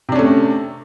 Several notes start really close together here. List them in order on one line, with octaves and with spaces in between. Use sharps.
C3 D4 C#4 A3